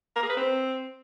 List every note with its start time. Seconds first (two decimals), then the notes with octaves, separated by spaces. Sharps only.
0.16 A#4
0.23 G#4
0.30 B4
0.37 C4